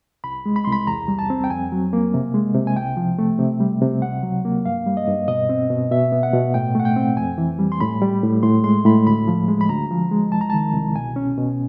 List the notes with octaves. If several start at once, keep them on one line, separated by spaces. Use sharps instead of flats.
C2 B5
G#3
B5
C2 C6
B5
E2 A#5
G3
A5
C4
G5
F2 G#5
F#3
A#3
C3
G#3
C3
G#5
C2 G5
F3
A3
C3
G3
C3
C#2 F#5
F#3
A#3
G2 F5
G3
D#5
G2
B2 D#5
C4
B2
B2 E5
B3
F#5
B2
A2 G5
A3 F#5
G5
C4
F2 G#5
E3
G3
C6
A2 B5
G3
A2
A2 C6
G#3 C6
A2 B5
D2 B5
F3
G#3
B5
D2 A#5
F3
G#3
C2 A5
A#5
D#3 A5
C2
B2 G#5
C#4
B2